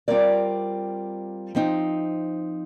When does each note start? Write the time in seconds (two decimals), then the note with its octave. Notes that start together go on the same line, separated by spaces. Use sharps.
0.08 G3 C4 F4 A#4 D5
1.55 F3 C4 D#4